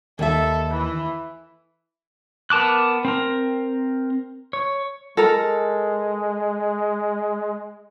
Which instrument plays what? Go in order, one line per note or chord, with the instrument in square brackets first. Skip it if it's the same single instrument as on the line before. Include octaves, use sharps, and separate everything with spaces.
[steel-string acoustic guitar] D#2 E5 [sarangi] A4
[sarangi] E3
[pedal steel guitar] B3 A#4 A5 D6 F#6
C4 A#4
C#5
[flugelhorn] G#3 [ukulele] A4 A#4